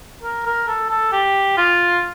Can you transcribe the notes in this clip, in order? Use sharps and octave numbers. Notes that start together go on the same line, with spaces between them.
A#4
A#4
A4
A4
G4
F4